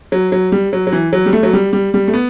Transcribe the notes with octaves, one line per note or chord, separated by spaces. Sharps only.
F#3
F#3
G3
F#3
F#3
E3
F#3
G3
A3
F#3
G3
G3
G3
A3
B3